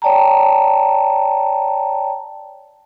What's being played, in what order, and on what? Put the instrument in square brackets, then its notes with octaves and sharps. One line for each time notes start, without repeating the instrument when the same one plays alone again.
[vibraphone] C#5 D5 G5 A5 A#5